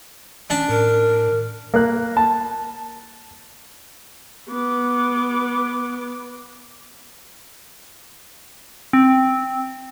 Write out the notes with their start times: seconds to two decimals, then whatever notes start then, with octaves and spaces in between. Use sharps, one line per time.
0.50 C#4 D4 A5
0.69 A2 A#4
1.74 A#3 F#6
2.17 A5
4.50 B3 D6
8.93 C4